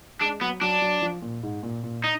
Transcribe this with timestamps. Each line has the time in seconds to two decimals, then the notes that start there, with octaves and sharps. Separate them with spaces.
0.21 G#3 D4
0.41 F#3 B3
0.61 F#3 D4
0.82 F#3
1.02 F3
1.22 A#2
1.43 G#2
1.63 A#2
1.83 A#2
2.04 D#4